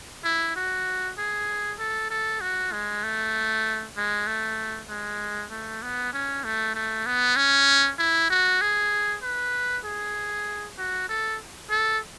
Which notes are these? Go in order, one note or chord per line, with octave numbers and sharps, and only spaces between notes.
E4
F#4
G#4
A4
A4
F#4
G#3
A3
G#3
A3
G#3
A3
B3
C#4
A3
A3
B3
C#4
E4
F#4
G#4
B4
G#4
F#4
A4
A4